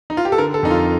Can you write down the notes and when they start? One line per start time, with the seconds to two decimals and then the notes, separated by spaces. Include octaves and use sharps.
0.10 D#4
0.17 F4
0.25 G4
0.32 A4
0.38 D3 A#4
0.54 A4
0.63 F2 D#4
0.70 F4